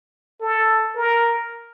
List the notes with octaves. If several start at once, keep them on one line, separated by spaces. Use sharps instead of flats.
A4
A#4